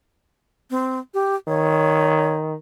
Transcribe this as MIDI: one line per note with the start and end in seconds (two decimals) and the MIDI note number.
0.71 1.00 60
1.14 1.35 67
1.48 2.54 51
1.48 2.36 73